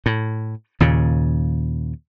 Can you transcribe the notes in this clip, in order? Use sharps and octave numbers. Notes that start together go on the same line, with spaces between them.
A2
D#2 A#2 C#3